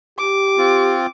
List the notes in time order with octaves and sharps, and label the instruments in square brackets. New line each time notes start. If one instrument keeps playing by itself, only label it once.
[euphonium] G4 [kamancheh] D6
[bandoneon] C4 F4